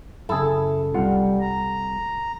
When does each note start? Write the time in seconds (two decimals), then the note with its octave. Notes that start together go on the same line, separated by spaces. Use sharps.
0.29 F#2 C#3 E4 G#4 A4
0.94 C2 G3 F4 F#5
1.40 A#5